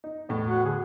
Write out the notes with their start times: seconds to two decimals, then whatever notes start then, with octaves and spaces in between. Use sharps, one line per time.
0.04 D#4
0.29 E2 A2
0.47 F#4
0.65 D3 G#4